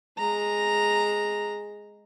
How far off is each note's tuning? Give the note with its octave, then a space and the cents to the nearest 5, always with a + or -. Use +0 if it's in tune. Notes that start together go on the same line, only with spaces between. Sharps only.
G#3 +0 A#5 +0